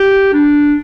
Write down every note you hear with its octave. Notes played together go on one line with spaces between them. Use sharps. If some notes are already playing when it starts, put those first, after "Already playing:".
Already playing: G4
D4